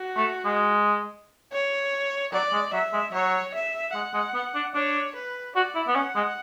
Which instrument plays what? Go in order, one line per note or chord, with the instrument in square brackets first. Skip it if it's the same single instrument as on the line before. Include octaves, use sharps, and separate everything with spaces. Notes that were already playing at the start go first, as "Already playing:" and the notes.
Already playing: [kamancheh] F#4
[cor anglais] A3
G#3
[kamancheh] C#5
[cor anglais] F#3 [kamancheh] D5
[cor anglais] G#3
[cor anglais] F#3 [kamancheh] E5
[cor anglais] G#3
[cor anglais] F#3 [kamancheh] C#5
[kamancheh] E5
[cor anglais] G#3 [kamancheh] F#5
[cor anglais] G#3
B3
D4
[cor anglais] D4 [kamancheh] C#5
[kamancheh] B4
[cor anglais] F#4 [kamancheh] D5
[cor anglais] E4
B3
[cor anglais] C#4 [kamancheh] F#5
[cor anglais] G#3